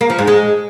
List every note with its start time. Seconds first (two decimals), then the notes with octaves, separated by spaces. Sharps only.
0.01 A#3
0.10 F3
0.19 G#2
0.28 G#3